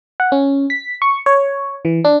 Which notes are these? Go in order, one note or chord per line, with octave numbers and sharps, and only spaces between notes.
F#5
C#4
B6
C#6
C#5
E3
D4